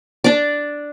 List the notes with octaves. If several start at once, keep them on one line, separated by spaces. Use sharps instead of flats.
D4 D5